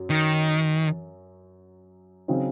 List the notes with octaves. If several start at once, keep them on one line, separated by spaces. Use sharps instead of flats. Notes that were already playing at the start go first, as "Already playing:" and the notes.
Already playing: F#2 F#3
D#3
C#3 F#3 C4 D#4